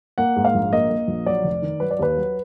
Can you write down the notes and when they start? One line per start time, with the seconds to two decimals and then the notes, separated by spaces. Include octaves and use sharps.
0.18 A#3 F#5
0.36 G#2
0.45 F5
0.54 A#1
0.73 A#3 D#5
0.90 A#3
1.07 A#1
1.26 F#3 D5
1.44 F1
1.62 D#3
1.80 F#3 B4
1.91 D5
1.99 D#2 B4
2.17 F#3